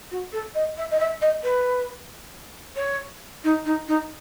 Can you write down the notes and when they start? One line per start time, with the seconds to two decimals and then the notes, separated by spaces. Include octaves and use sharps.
0.11 F#4
0.32 A4
0.54 D#5
0.77 E5
0.91 D#5
0.99 E5
1.21 D#5
1.43 B4
2.76 C#5
3.44 D#4
3.65 D#4
3.88 D#4